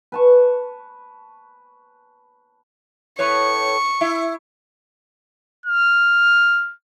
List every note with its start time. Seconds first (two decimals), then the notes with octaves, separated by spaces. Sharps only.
0.12 B4 A5 C#6
3.19 A2 B4 C#5 C#6
4.01 E4
5.66 F6